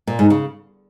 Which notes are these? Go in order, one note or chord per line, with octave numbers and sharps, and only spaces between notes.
A#2
G#2
C#3